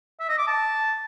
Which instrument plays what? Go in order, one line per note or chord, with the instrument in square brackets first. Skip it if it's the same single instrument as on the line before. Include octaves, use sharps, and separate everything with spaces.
[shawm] E5
D#5
D6
A5